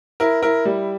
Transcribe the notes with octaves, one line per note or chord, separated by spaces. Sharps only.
E4 A#4
E4 A#4
G3